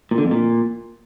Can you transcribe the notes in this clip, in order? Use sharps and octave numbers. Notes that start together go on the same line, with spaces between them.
A#2
D3
F2
A#2